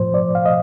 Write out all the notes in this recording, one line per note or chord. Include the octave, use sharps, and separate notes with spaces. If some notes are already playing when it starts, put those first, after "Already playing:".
Already playing: A2 F3 C5
D5
F5
D#5